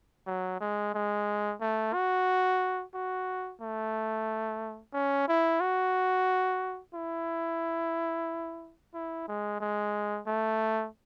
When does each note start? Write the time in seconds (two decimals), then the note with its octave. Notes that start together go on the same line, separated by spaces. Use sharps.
0.27 F#3
0.61 G#3
0.94 G#3
1.61 A3
1.94 F#4
2.94 F#4
3.61 A3
4.93 C#4
5.28 E4
5.61 F#4
6.94 E4
8.94 E4
9.28 G#3
9.60 G#3
10.27 A3